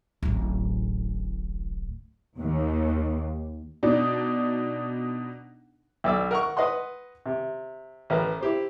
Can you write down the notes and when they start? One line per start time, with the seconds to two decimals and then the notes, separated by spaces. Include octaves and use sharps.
0.23 D1 A1
2.39 D#2
3.83 B2 D4 D#4
6.04 B1 D5 E6
6.31 A#4 F#5 C#6
6.57 B4 D#5 F#5 C6
7.26 C3
8.10 A1 A#4 B4 A#5
8.41 E4 G4 C5